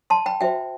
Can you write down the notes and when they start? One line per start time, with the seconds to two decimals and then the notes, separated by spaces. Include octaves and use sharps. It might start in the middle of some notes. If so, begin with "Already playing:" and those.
0.10 A5 C6
0.26 G5 B5
0.41 F#4 C5 E5 G5